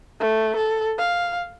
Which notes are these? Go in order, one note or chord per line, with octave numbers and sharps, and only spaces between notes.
A3
A4
F5